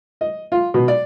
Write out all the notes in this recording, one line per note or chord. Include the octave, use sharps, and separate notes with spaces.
D#5
F4
B2
D5